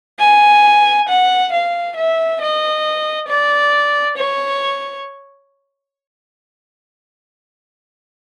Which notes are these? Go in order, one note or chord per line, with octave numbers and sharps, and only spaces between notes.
G#5
F#5
F5
E5
D#5
D5
C#5